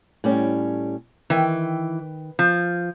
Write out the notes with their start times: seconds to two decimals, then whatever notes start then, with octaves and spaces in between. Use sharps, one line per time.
0.24 A2 G3 C#4
1.30 D#3 E3 G5
2.39 F3